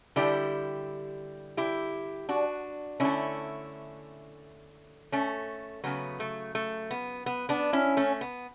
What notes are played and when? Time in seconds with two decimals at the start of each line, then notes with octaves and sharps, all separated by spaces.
0.16 D3 G3 E4 G4
1.57 E4 G4
2.29 D4 F#4
3.00 D3 A3 C#4 E4
5.12 A3 C#4
5.84 C#3 F#3 A3 B3
6.20 A3
6.55 A3
6.91 B3
7.26 B3
7.49 B3 D4
7.73 C#4 E4
7.97 A3 C#4
8.21 B3